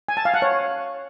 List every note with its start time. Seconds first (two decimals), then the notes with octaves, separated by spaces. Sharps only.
0.08 G#5
0.17 A5
0.25 F5
0.34 F#5
0.42 C#5